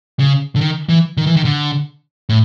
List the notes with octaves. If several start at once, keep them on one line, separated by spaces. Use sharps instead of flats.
C#3
D3
D#3
E3
D#3
E3
D#3
D3
A2